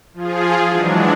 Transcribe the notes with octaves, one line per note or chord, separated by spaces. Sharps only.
F3 F4 G#4
E3 F#3 G#3 D4